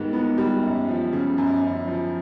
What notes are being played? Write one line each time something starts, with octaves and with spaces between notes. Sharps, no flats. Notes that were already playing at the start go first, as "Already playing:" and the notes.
Already playing: G#2 D#3 G3 B3
B3
G3
F#2
F3
C#3
F#2
F#2
F3